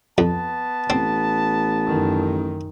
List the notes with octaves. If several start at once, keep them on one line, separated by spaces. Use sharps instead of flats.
F2 B3 A5
A1 C4
F#2 D#3